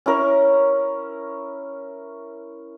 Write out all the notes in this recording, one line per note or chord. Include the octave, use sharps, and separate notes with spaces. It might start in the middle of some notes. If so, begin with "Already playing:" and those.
C#4 E4 A#4